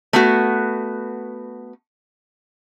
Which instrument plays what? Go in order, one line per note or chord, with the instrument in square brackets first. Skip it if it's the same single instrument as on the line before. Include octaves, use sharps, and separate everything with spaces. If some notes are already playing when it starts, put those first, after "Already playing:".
[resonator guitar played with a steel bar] A3 B3 F#4